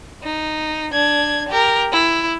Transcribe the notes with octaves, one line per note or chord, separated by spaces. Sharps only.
D#4
D4 G#6
G4 A#4
E4